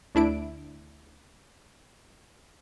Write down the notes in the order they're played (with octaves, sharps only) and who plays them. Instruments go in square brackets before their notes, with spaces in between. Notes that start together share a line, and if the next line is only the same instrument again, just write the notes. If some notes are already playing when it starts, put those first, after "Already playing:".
[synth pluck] D2 D4 E4 D7